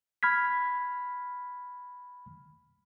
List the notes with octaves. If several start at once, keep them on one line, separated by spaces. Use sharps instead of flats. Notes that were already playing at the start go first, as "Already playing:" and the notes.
B5 F6 G#6 B6